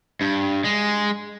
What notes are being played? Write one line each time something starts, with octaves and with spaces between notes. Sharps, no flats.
G2
G#3